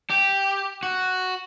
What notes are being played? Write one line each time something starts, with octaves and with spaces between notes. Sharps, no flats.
G4
F#4